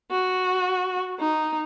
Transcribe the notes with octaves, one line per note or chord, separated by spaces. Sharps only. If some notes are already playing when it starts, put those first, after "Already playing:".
F#4
D#4